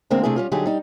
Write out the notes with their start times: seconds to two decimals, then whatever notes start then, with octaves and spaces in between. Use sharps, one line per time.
0.10 D2 D3 G#3 A#3 C4 A#4
0.23 C3 A3 D4 E4 G#4
0.36 G3 C#4 F4
0.52 D3 F#3 G3 D#4 G4 G#4
0.66 G3 D#4